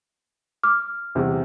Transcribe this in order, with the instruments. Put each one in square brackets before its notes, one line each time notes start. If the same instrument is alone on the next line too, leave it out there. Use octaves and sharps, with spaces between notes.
[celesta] D6 F6
[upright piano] E2 C3 G3